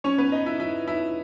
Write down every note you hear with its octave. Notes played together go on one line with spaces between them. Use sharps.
C#4 C#5
B3 B4
D#4
E4
E4
E4